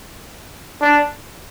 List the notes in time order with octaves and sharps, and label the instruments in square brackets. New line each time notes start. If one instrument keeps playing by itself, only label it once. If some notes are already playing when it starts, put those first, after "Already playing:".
[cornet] D4